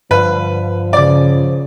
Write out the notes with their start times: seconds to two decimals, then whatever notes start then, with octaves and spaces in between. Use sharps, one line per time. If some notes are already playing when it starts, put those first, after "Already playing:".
0.11 G2 D3 F3 B4
0.93 C#3 D5 D6